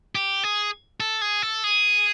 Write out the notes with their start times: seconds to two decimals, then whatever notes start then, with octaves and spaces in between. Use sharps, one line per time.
0.15 G4
0.44 G#4
1.00 A4
1.21 G#4
1.42 A4
1.64 G#4